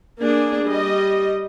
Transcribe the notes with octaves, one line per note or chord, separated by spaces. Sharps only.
A#3 D4 G#4
G3 D#5